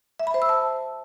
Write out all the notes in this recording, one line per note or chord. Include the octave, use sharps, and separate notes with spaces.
E5
B5
C5
E6
A5